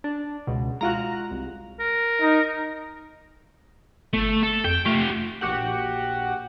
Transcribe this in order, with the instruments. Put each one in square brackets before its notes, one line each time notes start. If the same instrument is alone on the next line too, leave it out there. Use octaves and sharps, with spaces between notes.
[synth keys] D4
C#2 B2
[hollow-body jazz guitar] G#3 F4 F#4 [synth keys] A#5 F#6
[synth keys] C2
[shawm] A#4
[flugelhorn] D#4
[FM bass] G1 [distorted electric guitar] A3
[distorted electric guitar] A4
[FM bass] F2 [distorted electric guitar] G5
[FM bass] A3 [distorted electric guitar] F4 G4
[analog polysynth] A#1 F#4 G4 F#5